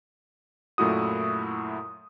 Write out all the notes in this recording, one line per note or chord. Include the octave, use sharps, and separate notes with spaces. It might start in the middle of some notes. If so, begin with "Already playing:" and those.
F#2 A#2 A3 E4 F#4 D#6